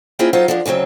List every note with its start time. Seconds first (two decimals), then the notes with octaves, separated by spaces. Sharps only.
0.19 A#3 C4 C#4 E4 F4 G#4
0.33 F#3 D#4 F4 A4 C5
0.48 F3 G#3 D4
0.66 D2 C#3 F#3 C4 C#5